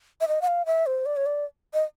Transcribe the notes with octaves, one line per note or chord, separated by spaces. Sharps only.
E5
D#5
F#5
F5
E5
C5
D5
C#5
D5
D#5